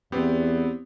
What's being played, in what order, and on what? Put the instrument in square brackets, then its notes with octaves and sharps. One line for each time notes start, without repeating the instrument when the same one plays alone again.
[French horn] E2 [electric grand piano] B3 C4 G4